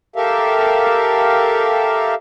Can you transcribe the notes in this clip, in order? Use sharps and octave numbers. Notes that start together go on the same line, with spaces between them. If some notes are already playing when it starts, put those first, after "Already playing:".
G4 A4 A#4 E5 F5